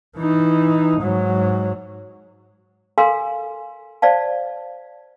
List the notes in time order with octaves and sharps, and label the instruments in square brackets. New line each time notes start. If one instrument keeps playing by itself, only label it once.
[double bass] E3 D#4
G#2 F#3
[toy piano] A4 A#4 F5 G#5 A#5 C6
C5 D5 F5 A5